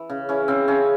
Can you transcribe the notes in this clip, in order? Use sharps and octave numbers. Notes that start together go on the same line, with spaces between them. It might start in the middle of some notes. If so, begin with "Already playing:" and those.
Already playing: E3
C#3
E3 C#4
C#3 C4
C#3 C#4